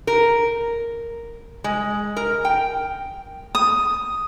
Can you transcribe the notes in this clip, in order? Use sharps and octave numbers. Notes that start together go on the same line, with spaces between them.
A#4
G#3
A#4
G5
D#6